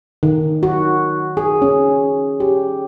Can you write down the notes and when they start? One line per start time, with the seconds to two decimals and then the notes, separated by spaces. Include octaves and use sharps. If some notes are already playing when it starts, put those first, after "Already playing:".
0.23 D#3
0.63 F#4
1.37 G#4
1.62 C#4
2.40 G4